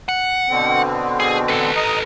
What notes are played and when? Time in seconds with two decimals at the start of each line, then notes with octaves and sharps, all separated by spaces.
0.09 F#5
0.49 B2 D3 C4
1.20 G#4
1.48 A4 B4
1.76 D#5 A#5 D#6